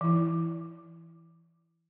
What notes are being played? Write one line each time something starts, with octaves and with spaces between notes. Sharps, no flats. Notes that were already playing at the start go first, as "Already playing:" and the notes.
E3 E4